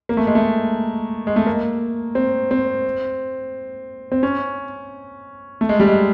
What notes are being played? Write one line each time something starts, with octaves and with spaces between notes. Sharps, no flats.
A#3
A3
G#3
A3
G#3
A3
A#3
C4
C4
C4
C#4
A3
G#3
G3
G#3